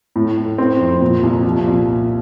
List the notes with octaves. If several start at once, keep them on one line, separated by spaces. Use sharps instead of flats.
A2
A2
C4
F2
A#2
C2
F3
A#2